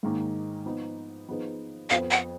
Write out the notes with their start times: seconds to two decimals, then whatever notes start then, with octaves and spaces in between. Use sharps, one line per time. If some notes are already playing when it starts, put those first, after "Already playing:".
0.03 G#2 D#3 A#3
0.66 F3 B3 D#4
1.28 F3 B3 D#4 G#4 B4
1.90 F2 F3 B3 F4 F5
2.11 F#5